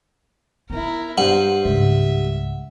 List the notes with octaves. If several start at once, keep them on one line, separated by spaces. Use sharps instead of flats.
B3 D#4 E4 A#4
G2 C5 F#5
C#2 G#2 E5